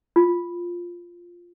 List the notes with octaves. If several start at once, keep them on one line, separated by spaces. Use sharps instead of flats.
F4